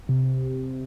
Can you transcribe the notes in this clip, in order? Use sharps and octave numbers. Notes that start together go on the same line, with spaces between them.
C3